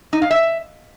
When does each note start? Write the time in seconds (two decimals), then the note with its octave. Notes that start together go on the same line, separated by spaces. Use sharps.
0.13 D#4
0.22 F5
0.31 E5